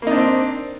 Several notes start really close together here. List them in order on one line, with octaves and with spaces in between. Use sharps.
A#3 D#4 D4 C4